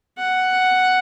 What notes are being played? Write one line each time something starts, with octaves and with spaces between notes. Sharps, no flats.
F#5